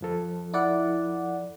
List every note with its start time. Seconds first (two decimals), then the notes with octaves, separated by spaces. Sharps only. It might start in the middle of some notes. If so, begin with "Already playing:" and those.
0.01 F2 F3 A4
0.54 E4 D5 F#5